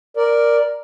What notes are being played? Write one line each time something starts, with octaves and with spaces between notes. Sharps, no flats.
A#4 D5